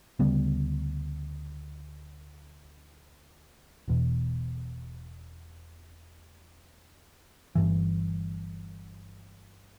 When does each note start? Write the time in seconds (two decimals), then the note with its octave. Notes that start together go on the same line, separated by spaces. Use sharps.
0.19 D2 C#3 G3 B3
3.88 E1 E2 B2
7.55 G1 G2 E3